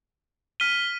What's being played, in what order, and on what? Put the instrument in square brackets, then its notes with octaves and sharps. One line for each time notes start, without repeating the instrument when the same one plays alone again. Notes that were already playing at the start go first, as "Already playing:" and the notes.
[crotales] F6 B6 D#7 G7